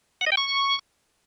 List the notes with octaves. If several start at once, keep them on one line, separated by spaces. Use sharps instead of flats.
F#5
D#5
G5
C#6